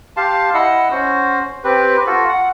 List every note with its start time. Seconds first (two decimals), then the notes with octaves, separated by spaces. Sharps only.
0.17 G4 F5 A5 C6
0.54 E4 D#5 F#5 E6
0.91 C#4 F#4 C5
1.64 C4 G4 B4
2.07 F4 F#4 A4
2.28 F#5